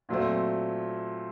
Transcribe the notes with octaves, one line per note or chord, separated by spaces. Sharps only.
A#2 F#3 A3 C4